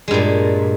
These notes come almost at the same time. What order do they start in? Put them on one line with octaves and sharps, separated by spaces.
G#3 G2 A#2